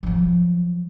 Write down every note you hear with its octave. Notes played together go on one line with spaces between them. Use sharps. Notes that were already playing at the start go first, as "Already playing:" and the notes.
F3 F#3